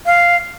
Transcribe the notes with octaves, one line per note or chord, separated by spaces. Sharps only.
F5